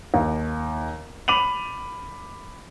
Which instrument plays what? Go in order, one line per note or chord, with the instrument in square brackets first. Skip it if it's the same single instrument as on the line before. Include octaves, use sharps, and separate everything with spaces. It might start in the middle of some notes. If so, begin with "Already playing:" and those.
[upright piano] D#2
B5 D6 D#7 F7 F#7